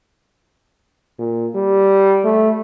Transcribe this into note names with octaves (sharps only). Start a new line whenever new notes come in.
A#2
G3
A3